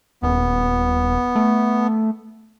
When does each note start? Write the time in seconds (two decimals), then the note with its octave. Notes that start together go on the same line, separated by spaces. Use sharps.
0.22 D#1 B3
1.36 A3